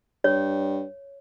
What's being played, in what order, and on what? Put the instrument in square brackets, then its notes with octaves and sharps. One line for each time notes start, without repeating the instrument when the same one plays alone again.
[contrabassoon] G2 [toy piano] C#5